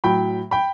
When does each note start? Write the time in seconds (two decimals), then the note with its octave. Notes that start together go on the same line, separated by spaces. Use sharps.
0.04 A2 F#3 G5 B5
0.51 G5 B5